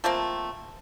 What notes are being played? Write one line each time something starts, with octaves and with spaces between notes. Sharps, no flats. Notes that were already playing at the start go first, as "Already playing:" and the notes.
F3 A3 A#3 C4